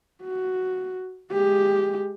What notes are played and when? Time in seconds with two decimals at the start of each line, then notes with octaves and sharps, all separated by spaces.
0.23 F#4
1.31 G#3 G4